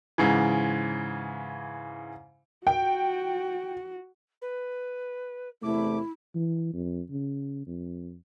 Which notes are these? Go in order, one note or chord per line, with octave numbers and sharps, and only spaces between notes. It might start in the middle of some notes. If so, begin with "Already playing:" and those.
G#2 C#3 E3
F#4 G5
B4
E2 C3 A3 E4 D6
E3
F2
C#3
F2